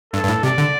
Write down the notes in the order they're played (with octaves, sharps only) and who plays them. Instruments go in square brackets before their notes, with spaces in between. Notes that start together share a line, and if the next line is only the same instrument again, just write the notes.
[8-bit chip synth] G2 [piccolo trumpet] A4
[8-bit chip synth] G2
A2
[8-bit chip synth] C3 [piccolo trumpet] D5
[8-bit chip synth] D3